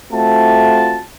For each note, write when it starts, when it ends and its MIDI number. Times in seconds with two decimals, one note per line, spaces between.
0.12 1.01 57
0.12 1.01 60
0.12 1.01 65
0.12 1.01 66
0.12 1.01 81